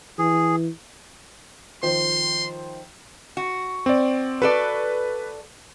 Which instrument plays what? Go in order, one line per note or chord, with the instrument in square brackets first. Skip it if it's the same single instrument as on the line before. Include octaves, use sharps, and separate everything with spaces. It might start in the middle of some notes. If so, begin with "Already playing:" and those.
[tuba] E3 [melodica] G#4
[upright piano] D#3 F3 C5 [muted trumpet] C6
[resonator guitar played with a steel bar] F#4
[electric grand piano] C4 D5
[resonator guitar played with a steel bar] F#4 A4 D5 [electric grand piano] B4